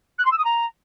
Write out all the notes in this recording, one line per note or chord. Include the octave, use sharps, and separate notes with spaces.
F#6
C6
E6
D#6
A#5